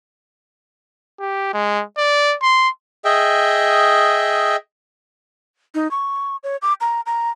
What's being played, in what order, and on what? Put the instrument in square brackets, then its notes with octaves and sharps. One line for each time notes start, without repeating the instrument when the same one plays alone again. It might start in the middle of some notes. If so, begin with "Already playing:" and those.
[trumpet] G4
G#3
D5
C6
[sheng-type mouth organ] G#4 D#5 E5 G5
[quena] D#4
C#6
C#5
D6
A#5
A#5